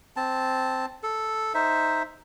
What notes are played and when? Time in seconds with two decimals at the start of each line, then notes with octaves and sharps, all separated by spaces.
0.16 C4 A5
1.03 A4
1.54 D#4 C5 E5